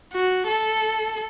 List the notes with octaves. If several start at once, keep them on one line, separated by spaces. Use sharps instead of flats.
F#4
A4